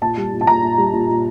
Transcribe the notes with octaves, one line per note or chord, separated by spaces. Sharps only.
A#2 A5
G3
A#2
A5
A#2 A#5
A#2
G3
A#2
A#2